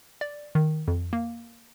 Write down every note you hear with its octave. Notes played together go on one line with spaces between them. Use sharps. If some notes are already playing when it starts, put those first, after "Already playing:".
D5
D#3
F2
A#3